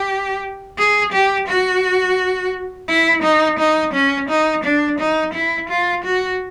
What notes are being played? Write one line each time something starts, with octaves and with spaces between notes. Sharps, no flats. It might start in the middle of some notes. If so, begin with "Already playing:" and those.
Already playing: G4
G#4
G4
F#4
E4
D#4
D#4
C#4
D#4
D4
D#4
E4
F4
F#4